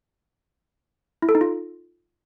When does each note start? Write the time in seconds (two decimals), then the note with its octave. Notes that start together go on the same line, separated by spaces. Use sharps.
1.22 E4
1.29 A4
1.35 D#4
1.41 F4